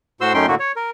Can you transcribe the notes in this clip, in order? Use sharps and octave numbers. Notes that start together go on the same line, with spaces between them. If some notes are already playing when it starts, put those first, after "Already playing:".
A2 F#4 C5 C6 E6
F#2 A3 C#4 D#4 G5 C6
A2 D3 A3 A#3 F#4
C#5
A#4